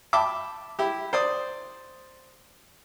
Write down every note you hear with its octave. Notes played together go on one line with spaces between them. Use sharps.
E5 G5 A5 B5 D6
E4 G4
C5 D5 D#6